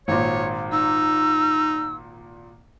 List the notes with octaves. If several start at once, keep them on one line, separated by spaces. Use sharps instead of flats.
G#1 A#2 C#5
D#4 E6